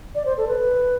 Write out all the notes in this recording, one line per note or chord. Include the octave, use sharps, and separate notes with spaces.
D5
C5
A4
B4